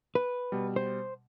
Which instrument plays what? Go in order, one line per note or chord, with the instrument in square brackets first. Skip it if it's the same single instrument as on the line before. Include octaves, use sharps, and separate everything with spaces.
[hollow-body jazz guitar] B4
[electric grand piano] B2 G3
[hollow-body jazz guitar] C5